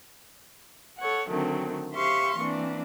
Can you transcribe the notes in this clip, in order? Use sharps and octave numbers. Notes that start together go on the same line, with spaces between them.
A4 C#5 F#5
D3 D#3 F#3 A3 C4
G4 C5 E5 F5 C6 C#6
E3 A#3 C4 D4